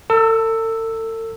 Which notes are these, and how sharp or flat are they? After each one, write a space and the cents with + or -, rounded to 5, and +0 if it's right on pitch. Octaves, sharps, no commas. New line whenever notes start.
A4 +40 E6 +0